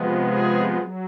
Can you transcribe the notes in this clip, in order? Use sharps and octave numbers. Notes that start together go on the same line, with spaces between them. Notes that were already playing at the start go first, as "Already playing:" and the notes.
Already playing: C3 F3 G#3 B3
G#4
F#3